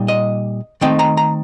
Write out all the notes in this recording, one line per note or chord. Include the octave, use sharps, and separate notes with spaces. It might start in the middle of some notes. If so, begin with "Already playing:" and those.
Already playing: A#2 G3 D#4
D#5
D#3 A3 C4 D#4 G5
A#5
A#5